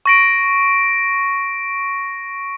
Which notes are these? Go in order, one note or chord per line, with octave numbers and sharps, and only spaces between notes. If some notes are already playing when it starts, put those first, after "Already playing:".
C#6 A#6 D7